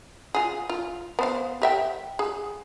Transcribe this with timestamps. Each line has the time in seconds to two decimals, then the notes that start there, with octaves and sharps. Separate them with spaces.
0.35 F4 G#4
0.69 F4
1.19 B3 C5 F5
1.62 G4 E5 G5
2.19 G#4